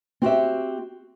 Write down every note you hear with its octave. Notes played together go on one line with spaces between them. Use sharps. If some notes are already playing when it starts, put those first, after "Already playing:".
C4 F#4 G4 E5